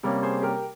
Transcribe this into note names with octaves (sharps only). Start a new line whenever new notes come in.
C3 G3 A#3 C#4
G#4 C5
G4 A#4